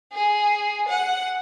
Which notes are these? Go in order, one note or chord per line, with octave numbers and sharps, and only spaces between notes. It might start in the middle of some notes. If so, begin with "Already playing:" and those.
G#4
F#5